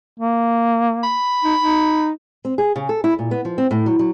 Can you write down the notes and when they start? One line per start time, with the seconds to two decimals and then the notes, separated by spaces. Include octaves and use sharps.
0.19 A#3
1.03 B5
1.44 D#4
1.60 D#4
2.45 C4
2.58 G#4
2.76 C#3
2.89 A4
3.04 E4
3.19 A#2
3.31 B3
3.45 F3
3.58 C4
3.71 A2
3.86 F#3
3.99 F#3